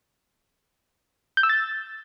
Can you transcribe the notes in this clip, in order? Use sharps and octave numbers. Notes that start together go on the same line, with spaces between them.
G6
E6
A6